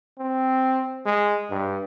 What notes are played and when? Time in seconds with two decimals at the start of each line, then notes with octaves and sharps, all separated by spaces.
0.18 C4
1.06 G#3
1.50 G2